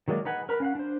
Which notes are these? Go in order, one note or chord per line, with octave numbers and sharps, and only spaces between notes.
D#3 F#3 G#3 A#3 D5
D#4 B4 F#5 G#5
A#4 B4 A#5 B5
C#4 F5 F#5
D4 C5